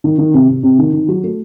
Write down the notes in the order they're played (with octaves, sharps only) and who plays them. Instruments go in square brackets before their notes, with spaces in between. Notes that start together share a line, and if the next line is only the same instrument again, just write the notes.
[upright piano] D#3
D#3
C3
C3
C3
D#3
D#3
F#3
A3